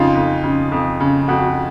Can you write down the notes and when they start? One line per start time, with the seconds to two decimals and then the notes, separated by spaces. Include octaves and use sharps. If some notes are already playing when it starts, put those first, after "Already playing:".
Already playing: F2 C#3 D#4 F4
0.15 F2
0.43 C#3
0.72 F2
1.00 C#3
1.28 F2 F#4